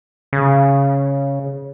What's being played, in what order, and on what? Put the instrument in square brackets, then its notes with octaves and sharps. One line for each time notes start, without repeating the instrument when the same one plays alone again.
[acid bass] C#3